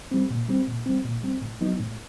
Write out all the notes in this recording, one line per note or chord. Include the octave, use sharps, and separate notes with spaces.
G3 C4
A#2
G3 C4
A#2
G3 C4
A#2
G3 C4
A2
F#3 B3 D#4
A2